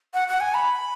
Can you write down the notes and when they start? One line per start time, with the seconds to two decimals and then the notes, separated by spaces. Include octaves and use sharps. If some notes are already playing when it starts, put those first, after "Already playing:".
0.14 F#5
0.28 F#5
0.40 G#5
0.54 B5